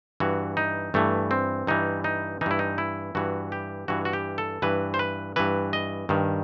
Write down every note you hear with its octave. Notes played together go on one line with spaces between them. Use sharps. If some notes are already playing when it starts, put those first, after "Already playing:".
G2 E3 F#4
D#4
G2 E3 A3
C4
G2 E3 D#4
D#4
G2 E3 D#4 E4
D#4
E4
G2 E3 F#4
G4
G2 E3 F#4
F#4
G4
A4
G2 E3 B4
C5
B4
G2 E3 B4
D#5
G2 D#3